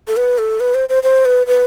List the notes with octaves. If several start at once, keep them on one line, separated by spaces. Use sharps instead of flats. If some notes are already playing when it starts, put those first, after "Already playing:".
A4
B4
A4
B4
C5
C5
C5
B4
B4